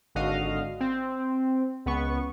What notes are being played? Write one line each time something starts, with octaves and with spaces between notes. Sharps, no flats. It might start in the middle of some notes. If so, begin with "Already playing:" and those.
G#1 D3 F#4 D#5 F5
C4
C#2 B3 C#6